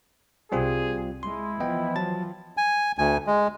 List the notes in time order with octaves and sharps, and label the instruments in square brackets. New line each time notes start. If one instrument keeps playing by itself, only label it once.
[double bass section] C2 [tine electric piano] G3 C4 F4 [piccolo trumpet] G#4
[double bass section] G#3 [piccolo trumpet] E4 [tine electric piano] C6
[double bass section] E3 F3 [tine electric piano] B3 D#5 G5
[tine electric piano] F#3 A5 A6
[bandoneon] G#5
D2 G#5
G#3